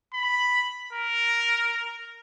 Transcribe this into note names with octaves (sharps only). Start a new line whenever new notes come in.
B5
A#4